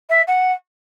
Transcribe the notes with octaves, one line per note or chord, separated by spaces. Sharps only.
E5
F#5